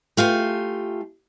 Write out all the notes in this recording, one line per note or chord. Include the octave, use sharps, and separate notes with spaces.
A3 F4 G4 G#5